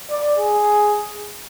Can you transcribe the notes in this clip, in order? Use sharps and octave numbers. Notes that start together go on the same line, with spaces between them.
D5
G#4